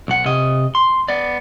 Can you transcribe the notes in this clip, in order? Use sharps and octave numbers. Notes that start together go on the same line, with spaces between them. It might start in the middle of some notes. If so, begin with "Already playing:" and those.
B1 F#5
C3 D#5
C6
B3 D5